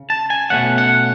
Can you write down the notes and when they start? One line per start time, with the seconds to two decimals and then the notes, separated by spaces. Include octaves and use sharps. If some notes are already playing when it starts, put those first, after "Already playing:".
Already playing: C#3
0.10 A5
0.30 G#5
0.50 B2 A3 C#4 F#5
0.78 F#5